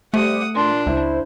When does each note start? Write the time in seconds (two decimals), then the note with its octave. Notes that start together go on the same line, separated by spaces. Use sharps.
0.14 C3 G3 A3 G4 F#5 D#6
0.55 A#2 D4 C6
0.86 C#2 E4 C5